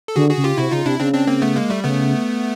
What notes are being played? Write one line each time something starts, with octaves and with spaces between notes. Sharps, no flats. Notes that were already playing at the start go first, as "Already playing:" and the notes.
A4
D3 F#4 G#4
F#4 G#4
C#3
F4 G4
C3 E4 F#4
C#3 D#4 F4
C3 D4 E4
C#3 C4 D4
C4 D4
A#3 C4
A3 B3
G#3 A#3
G3 A3
C#3 A3 B3